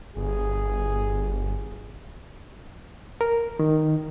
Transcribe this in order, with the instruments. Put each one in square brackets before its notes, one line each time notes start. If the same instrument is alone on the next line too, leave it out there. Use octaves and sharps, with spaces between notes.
[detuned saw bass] G1 [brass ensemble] G#4
[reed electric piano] A#4
D#3